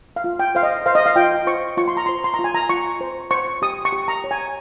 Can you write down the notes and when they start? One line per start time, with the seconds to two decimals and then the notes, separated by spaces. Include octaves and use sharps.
0.16 F5
0.24 F4
0.39 G5
0.55 C5 F5
0.63 D#5
0.86 C5 F5
0.95 D#5
1.06 F5
1.16 F4 G5
1.47 C5 C#6
1.77 F4 C#6
1.88 C6
1.97 A#5
2.06 C6
2.09 C5
2.24 C6
2.34 A#5
2.39 F4
2.44 G#5
2.54 A#5
2.69 F4 C#6
3.01 C5
3.31 C5 C#6
3.62 G4 D#6
3.85 C#6
3.92 G4
4.08 A#5
4.24 C#5
4.31 G#5